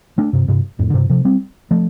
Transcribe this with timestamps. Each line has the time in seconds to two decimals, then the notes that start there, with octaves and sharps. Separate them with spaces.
0.18 A3 D4
0.33 G2 C3
0.48 G2 C3
0.79 F2 A2
0.90 D3
0.94 G2 C3
1.09 C3 F3
1.25 G3 C4
1.71 F3 A3